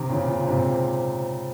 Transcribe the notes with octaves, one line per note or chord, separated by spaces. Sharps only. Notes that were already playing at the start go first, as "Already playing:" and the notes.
Already playing: C3 D#3
A#2 C#3
A#2
G#2 C3